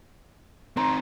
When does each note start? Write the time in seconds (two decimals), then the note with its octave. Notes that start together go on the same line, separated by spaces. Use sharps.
0.77 C4 D#4 A#5 C6